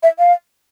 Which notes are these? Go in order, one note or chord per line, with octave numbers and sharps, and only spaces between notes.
E5
F5